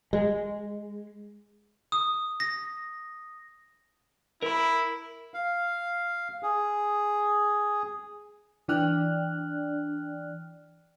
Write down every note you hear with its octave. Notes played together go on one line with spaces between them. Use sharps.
G#3
D#6
A#6
E4 A#4 B5
F5
G#4
E3 D4 D5 G5 F6 F#6